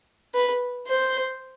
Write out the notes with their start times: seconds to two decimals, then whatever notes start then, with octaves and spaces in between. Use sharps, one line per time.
0.34 B4
0.87 C5